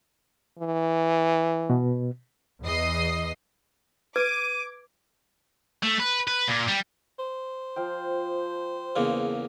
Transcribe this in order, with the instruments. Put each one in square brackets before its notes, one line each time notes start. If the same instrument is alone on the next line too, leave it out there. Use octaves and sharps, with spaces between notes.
[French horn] E3
[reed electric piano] B2
[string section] E2 E3 D#5 C7
[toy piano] B4 [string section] D6 [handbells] G#6 [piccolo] D#7
[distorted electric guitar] A3
B4
B4
A#2
G3
[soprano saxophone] C5
[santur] F3 F5 G5
[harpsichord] E2 C#3 A#3